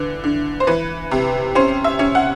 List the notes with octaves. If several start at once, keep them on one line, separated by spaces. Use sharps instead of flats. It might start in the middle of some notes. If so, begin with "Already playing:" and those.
Already playing: D3 E3
D3
C5
E3 B4
C3
C#4 C5
E5
C#4
F#5